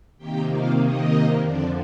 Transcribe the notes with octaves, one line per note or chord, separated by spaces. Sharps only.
C3 D#3 A#3 G4 G5
F4 F5
D#4 D#5
F2 D3 F3 D4 D5